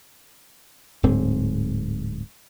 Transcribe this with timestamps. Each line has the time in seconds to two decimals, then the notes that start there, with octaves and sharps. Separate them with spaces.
1.03 D1 G#2 C4